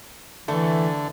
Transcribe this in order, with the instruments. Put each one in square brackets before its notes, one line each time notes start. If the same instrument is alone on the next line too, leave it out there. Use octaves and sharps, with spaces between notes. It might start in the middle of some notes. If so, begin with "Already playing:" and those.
[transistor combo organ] D3 [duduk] E3 [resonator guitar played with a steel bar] A3